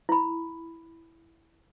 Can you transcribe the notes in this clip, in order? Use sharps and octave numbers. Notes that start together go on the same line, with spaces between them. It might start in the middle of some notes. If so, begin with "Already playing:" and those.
E4 B5